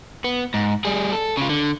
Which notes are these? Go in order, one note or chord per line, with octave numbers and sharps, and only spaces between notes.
B3
G#2
G3 G#4
A4
C#3 F4
D3